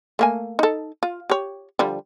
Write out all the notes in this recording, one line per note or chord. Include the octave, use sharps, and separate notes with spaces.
A3 A#3 G#5
D#4 A4
F4
G4 C#5
D3 F3 G3